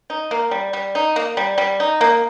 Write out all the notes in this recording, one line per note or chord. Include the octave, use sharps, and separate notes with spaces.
D#4
A#3
G3
G3
D#4
A#3
G3
G3
D#4
A#3